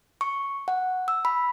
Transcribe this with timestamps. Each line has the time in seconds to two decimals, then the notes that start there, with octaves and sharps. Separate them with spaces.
0.21 C#6
0.68 F#5
1.08 E6
1.25 B5